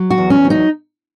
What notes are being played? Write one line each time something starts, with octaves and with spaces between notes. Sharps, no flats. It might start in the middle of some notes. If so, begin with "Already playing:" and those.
Already playing: F#3
F#4
E2
C#4
F#3
D#4